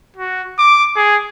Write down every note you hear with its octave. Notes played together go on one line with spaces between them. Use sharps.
F#4
D6
G#4